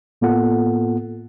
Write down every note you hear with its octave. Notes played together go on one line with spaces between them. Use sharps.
A2 A#3 B3 F4 A4 F#5